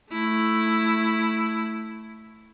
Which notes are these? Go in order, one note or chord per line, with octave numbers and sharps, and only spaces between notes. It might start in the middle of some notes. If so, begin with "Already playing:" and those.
A3 E4